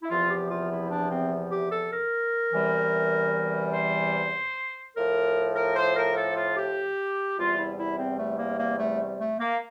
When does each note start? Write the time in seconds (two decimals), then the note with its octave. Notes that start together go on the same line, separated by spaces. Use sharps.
0.02 E4
0.10 E2 C3 F3 F4
0.30 G4
0.51 F4
0.71 E4
0.91 D4
1.11 C4
1.52 G4
1.72 A4
1.92 A#4
2.53 E2 C3 E3 G3
3.73 C5
4.95 A2 F3 A#4
5.56 A#4
5.76 C5
5.96 A#4
6.16 A4
6.36 F4
6.57 G4
7.38 E2 C3 G3 F4
7.58 E4
7.78 E4
7.98 C4
8.19 A3
8.38 A#3
8.59 A#3
8.79 A3
9.19 A3
9.40 A#3